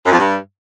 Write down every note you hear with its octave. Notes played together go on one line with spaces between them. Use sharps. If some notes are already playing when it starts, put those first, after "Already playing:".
F#2
F2
G2